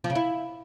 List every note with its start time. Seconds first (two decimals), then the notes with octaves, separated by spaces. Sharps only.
0.04 F3
0.10 C#3
0.15 E4